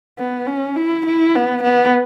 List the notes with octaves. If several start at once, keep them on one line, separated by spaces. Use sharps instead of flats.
B3
C#4
E4
E4
B3
B3